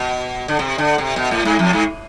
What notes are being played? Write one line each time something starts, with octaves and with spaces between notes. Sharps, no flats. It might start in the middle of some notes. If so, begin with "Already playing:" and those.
Already playing: B2
D3
C3
D3
C3
B2
A2
G#2
F2
G#2